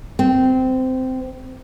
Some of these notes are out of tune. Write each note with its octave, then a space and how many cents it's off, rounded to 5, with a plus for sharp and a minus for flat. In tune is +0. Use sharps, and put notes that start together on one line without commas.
C4 -15